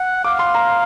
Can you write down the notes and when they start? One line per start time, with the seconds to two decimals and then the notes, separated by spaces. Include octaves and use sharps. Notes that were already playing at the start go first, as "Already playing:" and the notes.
Already playing: F#5
0.24 F5 D6
0.39 C6
0.55 A#5